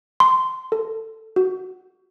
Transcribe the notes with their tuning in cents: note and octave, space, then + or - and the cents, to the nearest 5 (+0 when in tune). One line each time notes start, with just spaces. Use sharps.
C6 -15
A4 +10
F#4 +5